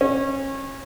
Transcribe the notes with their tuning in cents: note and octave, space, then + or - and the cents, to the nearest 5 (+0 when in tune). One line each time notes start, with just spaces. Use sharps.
C#4 -30